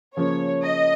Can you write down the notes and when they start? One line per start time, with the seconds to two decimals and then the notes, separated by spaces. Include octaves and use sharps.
0.17 C#3 F3 A#3 C#4 C#5
0.64 D#5